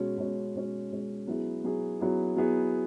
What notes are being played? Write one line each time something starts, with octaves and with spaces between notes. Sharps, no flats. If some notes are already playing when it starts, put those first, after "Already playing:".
Already playing: B2 G#3 C#4
B2 G#3 C#4
B2 G#3 C#4
B2 G#3 C#4
F#3 B3 E4 G#4
F#3 B3 E4 G#4
F#3 B3 E4 G#4
F#3 B3 E4 G#4